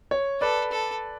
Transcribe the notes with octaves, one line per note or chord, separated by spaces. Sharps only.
C#5
A4 B4 D5
A4